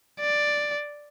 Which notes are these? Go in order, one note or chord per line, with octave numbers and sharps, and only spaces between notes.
D5